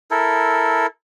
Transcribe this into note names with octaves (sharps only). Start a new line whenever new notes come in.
E4 A4 A#4